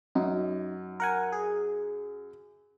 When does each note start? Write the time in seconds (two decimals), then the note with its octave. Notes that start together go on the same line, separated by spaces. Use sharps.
0.15 F#2 D#4
1.00 A#4 F#5 G#5
1.32 G#4